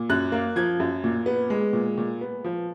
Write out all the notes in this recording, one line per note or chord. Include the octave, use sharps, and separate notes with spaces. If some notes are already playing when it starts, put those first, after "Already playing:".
Already playing: A#2
F#2 F#6
A#3
F3 G#6
F#2
A#2
B3
G#3
A#2
A#2
B3
F3